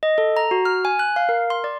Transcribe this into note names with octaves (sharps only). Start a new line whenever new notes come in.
D#5
A4
A#5
F#4
F6
G#5
F#6
F5
A#4
C6
D5